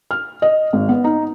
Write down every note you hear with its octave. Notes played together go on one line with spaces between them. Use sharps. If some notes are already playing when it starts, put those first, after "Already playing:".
F6
D#5
G#1
B3
D#4